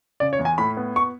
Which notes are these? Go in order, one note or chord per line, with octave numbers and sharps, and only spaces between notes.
C#3 D5
C#5
E2
G#5
A2 B5
B3
C#6